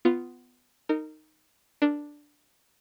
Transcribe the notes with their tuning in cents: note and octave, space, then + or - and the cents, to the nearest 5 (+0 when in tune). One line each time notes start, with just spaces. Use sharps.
B3 +15 F4 -5
D#4 -5 A#4 -30
D4 +0 A#4 -15